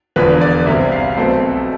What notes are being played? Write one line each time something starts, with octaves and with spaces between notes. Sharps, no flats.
E1 E2 D3 F3 B4
D5
C2 C3 G3 C4 E5
F5
B1 B2 A3 C4